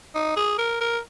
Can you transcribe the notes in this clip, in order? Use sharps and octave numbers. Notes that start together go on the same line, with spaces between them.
D#4
G#4
A#4
A#4